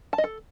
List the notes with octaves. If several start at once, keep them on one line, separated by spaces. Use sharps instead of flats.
A5
D#5
A4